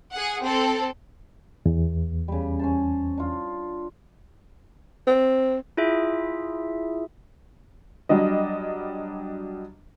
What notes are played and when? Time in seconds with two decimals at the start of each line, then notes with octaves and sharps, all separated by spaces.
0.13 G#4 F#5
0.42 C4 A4
1.66 E2
2.28 C#3 G3
2.59 C#4 C5 A5
3.18 D4 F4
5.07 C4
5.77 E4 F4 G#4 E5
8.09 F#3 G3 D4 D#5